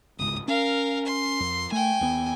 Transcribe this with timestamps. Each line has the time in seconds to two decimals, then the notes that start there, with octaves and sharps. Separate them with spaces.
0.19 G1 C#2 G#2 D#6
0.48 C#4 A#4 F5
1.05 C6
1.40 F2
1.72 A3 G5 G#5
2.01 D#2 B3